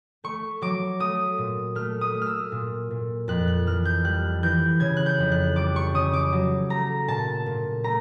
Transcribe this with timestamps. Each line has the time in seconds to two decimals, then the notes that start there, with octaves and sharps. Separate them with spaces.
0.24 A3 C#6
0.62 F#3 D6
1.00 A3 D#6
1.38 A#2
1.75 A3 F6
2.01 D#6
2.14 A3
2.22 F6
2.27 E6
2.52 A#2
2.91 A#2
3.28 F2 F#6
3.47 F#6
3.67 E3 F6
3.85 G6
4.04 G3 F#6
4.43 E3 G6
4.80 C#3 G#6
4.97 F#6
5.06 G6
5.19 F2
5.32 F#6
5.56 G3 D6
5.76 C#6
5.94 C#3 D#6
6.13 D6
6.32 F#3
6.70 A3 A#5
7.08 A#2 A5
7.46 A#2
7.84 A3 A#5